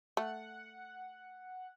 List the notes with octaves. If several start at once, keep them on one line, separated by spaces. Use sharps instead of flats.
A3 F#5